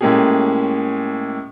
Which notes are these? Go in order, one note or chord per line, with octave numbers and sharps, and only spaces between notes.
A2 G#3 A#3 C#4 G4 G#4